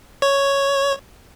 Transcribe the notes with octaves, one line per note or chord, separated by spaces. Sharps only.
C#5